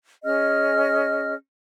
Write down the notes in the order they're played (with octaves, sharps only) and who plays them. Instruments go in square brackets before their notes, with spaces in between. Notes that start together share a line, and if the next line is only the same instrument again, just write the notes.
[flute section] C#4 G#4 D#5 F6